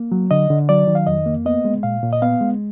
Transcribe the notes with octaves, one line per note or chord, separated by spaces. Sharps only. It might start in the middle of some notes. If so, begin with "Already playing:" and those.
Already playing: A#3
F#3
D3 D#5
D3
F#3 D5
D#3
F5
F2 D#5
A#3
B3 D#5
G#3
A#2 F5
A#2
D#5
B3 F5
G#3